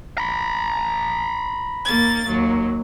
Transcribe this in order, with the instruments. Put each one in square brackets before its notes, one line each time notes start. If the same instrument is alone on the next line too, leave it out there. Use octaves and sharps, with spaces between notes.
[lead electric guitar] A#5 B5
[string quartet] D#2 A#3 A6
D#2 F#3